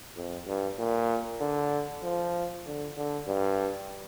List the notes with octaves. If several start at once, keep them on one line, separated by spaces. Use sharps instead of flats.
F2
G2
A#2
D3
F3
D3
D3
G2